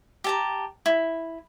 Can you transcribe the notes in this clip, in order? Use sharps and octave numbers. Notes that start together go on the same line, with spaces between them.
G4 A5 A#5
E4